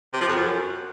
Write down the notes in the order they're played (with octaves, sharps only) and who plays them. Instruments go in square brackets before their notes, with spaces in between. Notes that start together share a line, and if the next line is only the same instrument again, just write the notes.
[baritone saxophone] C3
F3
F2
F#2